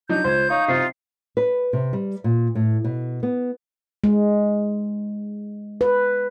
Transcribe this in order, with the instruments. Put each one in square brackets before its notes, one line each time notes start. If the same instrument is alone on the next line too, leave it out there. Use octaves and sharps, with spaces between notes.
[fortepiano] F#3 D4 D#4 [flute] G6
[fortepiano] C#2 [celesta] F4 G#6 [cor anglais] C5
[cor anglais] D#4 [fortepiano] C#5 [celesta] F5 C#6
[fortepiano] C3 C4 [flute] F4 [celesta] C7
[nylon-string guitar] B4
C3
G3
A#2
A2
B2
B3
[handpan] G#3
B4